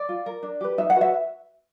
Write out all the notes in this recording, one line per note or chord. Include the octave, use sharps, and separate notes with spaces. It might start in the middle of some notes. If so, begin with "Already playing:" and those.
Already playing: D5
F4
A#4
D4
G4 B4
D#4 E5
F#5
F#4 B4
E5